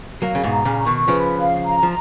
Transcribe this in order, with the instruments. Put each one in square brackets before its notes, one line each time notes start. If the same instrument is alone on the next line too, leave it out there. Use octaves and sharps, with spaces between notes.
[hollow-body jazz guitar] F#3 A#3 [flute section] F5
[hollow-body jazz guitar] C#3
G#2 B2
[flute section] A#5
[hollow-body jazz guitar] A#2 C#3
[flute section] C#6
[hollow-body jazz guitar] B2 D#3
[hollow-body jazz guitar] C#3 F3 [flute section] B4
[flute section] F5
A#5
[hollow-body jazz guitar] F3